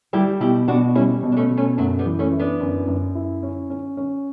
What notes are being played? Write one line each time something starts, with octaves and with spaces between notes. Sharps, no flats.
G3 E4 G4
B2 E4 G4
B2 D4 F#4
G3 C#4 E4
B2
D4
A3 C#4
B2
A3 C#4
F#2 F#3 A3
G3 B3
E3
A3 C#4
E4
B3 D4
F#2
F#2
E4
C#4
C#4
C#4